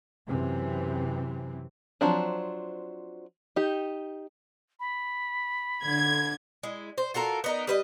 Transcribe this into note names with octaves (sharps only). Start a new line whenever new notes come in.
F#2 C3 E3 C4
F3 F#3 C4 D4
D#4 G4
B5
D3 G#6
G#3 E4
C5
F4 F#4 A4 A#4
B3 D#4 A#4
G3 B4 D#5